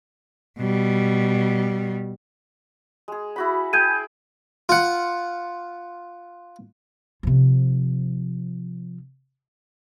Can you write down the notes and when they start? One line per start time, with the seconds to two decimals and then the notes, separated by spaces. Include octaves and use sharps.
0.59 B2 G3
3.08 G#3 G#4
3.36 E4 F#4 B5
3.73 G#4 G5 A5 G6 G#6 D#7
4.69 F4 F#5
7.23 C3 F3